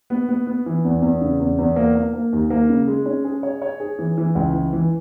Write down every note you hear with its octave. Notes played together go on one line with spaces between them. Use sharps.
B3
B3
B3
E3
E2
E2
C#3
E2
E2
A#3
A#3
A#3
D#2
A#3
C#3
G#3
C#4
G#4
C#5
C#5
G#4
E3
E3
C#2
E3
E3